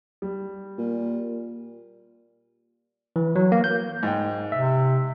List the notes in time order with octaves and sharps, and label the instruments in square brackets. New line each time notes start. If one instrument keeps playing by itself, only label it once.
[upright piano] G3
[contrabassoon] A#2
[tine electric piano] E3
F#3
A#3
G6
[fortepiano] G#2 G5
[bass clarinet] C3 [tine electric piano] E5